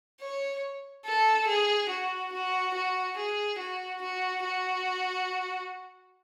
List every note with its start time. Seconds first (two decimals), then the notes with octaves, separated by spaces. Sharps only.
0.21 C#5
1.05 A4
1.48 G#4
1.89 F#4
2.33 F#4
2.74 F#4
3.17 G#4
3.59 F#4
4.02 F#4
4.44 F#4